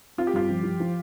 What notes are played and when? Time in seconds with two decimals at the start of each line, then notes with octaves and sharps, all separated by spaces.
0.18 C4 F4
0.27 G4
0.34 G2 F4
0.49 F3
0.64 F3
0.80 F3